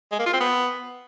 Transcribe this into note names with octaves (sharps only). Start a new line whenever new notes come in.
G#3
A#3
F4
C4
B3